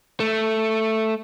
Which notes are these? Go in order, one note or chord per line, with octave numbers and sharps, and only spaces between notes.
A3